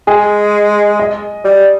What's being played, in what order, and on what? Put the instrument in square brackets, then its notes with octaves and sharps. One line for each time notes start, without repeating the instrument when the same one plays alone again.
[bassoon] G#3 [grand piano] G#4
[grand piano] D#5
[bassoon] G3